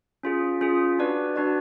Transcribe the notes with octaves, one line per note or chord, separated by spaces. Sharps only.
C#4 F4 G#4
C#4 F4 G#4
D4 F#4 B4 D5
D4 F#4 B4 D5